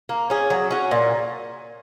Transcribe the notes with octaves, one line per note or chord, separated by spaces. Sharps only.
A#3
C#4 G#4
F#3
C#4 F#4
A#2